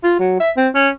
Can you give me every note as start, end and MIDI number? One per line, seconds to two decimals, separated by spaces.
0.03 0.15 65
0.19 0.36 54
0.40 0.51 76
0.57 0.69 60
0.75 0.89 61